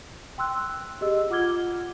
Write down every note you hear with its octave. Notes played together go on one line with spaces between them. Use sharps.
G5 C6 E6 F#6
G4 G#4 D#5 E6
F4 F#5 D6 F6 G#6 G7